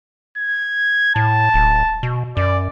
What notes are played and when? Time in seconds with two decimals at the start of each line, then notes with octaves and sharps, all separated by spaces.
0.38 G#6
1.16 A2 A5
1.54 D1
2.03 B2
2.37 F#2 D5